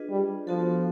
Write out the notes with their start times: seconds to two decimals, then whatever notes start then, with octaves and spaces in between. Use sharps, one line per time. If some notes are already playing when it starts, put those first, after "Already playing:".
Already playing: D4 F4 G#4 B4 D#5
0.10 G3
0.47 F3 B3 D4 F#4 A4